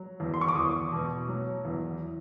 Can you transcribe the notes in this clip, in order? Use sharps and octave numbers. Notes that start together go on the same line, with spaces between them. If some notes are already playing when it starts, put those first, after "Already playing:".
Already playing: F#3
E2
C6
C#6
D6
E2 D#6
B2
F#3
E2